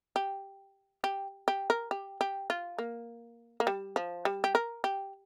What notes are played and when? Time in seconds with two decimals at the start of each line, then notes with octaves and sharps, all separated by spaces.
0.16 G4
1.04 G4
1.48 G4
1.70 A#4
1.91 G4
2.21 G4
2.50 F4
2.79 A#3
3.60 A#3
3.67 G3
3.96 F3
4.25 G3
4.44 G4
4.55 A#4
4.84 G4